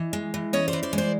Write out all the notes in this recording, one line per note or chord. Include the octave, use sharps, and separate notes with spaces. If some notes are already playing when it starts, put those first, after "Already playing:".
Already playing: E3 D#5
G#3
E3
C#4 C#5 D#5
C5 D5
E3
C5 D5
G#3
C5 D5